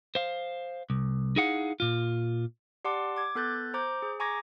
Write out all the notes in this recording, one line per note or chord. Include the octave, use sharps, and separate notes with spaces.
C5 F5
C2
D#4 E4 G#4 F5 F#5
A#2 F4
G4 D5 F#5 A5 C6 D6
D6 G#6
B3 A4 F#6 G6 A6
C5 A#5 D6 G6
G#4
G#5 A#5 C#6 D6 G#6 A#6